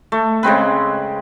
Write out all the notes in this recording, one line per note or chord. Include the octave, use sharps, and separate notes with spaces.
A3
C#3 G#3 C4 B4